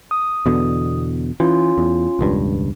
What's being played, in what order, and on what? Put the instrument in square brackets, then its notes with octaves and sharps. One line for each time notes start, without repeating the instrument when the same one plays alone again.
[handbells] D#6
[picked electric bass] E2 B2 D3
[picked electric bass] E3 [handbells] C#4 F4
[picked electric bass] E2
E1 C#2 G2